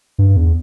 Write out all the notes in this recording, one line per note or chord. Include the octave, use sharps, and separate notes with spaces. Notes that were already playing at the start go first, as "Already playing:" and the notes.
G2
E2